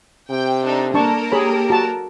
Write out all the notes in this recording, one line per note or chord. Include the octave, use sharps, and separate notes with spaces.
C3 G5
D4 D#4 A4
A#3 D4 A4 A#4 A5 C#6
G4 G#4 C#5 B5
F#4 A5